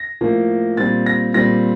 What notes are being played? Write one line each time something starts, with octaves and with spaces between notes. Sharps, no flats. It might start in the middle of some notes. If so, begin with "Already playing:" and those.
Already playing: A#6
A2 F3 A#3
A#2 G3 C4 A6
A#6
A#2 G3 C4 A#6